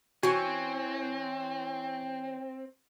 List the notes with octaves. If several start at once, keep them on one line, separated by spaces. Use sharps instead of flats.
E3 C4 C#4 F#4 G#5 C#6